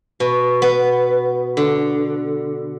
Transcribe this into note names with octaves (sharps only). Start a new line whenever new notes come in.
B2
B3
D3